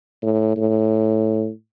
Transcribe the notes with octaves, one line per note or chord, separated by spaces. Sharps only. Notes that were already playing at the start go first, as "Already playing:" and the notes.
A2
A2